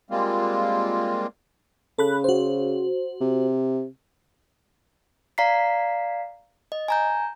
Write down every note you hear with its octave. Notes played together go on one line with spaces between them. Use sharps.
G3 G#3 A#3 C4 F4
C#3 A4 B5 F#6
F#4 C5
C3
D5 F5 A#5 B6 C7
D#5
G#5 A#5 G6